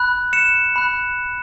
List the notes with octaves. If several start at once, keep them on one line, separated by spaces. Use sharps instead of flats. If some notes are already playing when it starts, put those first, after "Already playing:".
Already playing: B5 F#6
C#7 E7
B5 F#6